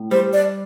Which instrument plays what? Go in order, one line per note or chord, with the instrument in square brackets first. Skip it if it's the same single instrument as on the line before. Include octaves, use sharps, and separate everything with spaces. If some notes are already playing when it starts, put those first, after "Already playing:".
Already playing: [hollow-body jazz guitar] A2
[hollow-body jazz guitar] G3 [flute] C5
[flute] D5